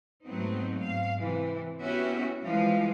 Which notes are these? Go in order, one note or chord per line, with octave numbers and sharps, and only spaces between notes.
G#2 F#3 A3 B3 C4 D#4
G#2 F5
C3 E3
B3 C#4 E4 F#4 G4 E5
E3 F3 G3 G#3 F5